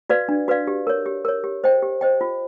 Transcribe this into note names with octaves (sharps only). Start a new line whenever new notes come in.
F#4 B4 D5 F5
D4
F#4 B4 D5 F5
G4
A#4 C#5
G4
A#4 C#5
G4
C5 D#5 G5
G4
C5 D#5 G5
F4